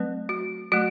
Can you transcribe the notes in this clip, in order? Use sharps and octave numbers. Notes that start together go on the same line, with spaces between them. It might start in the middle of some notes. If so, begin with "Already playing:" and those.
Already playing: F#3 A3 C4 B4
F#4
F#3 A3 F#4